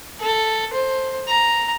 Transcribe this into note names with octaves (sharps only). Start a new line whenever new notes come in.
A4
C5
A#5